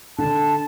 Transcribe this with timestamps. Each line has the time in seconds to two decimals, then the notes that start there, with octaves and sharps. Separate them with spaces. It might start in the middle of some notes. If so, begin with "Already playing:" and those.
0.18 D3 A5